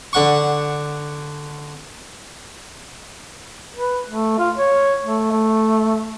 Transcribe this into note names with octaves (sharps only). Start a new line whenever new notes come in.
D3 F#5 C#6
B4
A3
F4
C#5
A3
A3